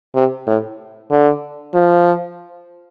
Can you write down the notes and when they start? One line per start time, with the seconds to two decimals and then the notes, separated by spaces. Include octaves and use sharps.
0.15 C3
0.47 A2
1.11 D3
1.74 F3